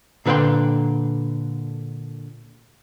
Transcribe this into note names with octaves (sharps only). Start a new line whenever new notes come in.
A#2 D3 B4 C#5 G5 C6